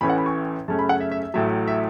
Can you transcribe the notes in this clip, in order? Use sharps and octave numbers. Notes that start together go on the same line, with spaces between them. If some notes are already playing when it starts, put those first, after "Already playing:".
A1 A2 E3 C#4 B5
F#5
B5
C#6
F#2 C#3 A3 C#4 A5
B5
F#5
E5
E5
E5
A1 A2 F#3 E5
E5